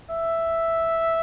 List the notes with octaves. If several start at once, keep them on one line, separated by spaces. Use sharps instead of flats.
E5